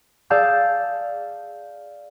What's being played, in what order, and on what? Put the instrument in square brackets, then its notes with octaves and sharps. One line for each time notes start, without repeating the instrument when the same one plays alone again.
[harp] G#4 D5 F5 A5 E6 G6